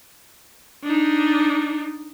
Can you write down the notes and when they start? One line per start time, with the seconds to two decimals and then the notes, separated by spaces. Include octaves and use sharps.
0.84 D4 D#4